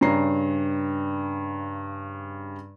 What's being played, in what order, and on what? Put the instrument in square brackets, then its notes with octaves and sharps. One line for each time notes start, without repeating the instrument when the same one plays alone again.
[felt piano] G2 C#3 C#4 A#5 C7